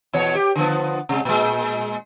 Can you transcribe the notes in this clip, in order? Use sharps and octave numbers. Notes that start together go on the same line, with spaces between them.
E2 B2 C#5
G4
D3 F3 B3
C3 G#3
A#2 G#3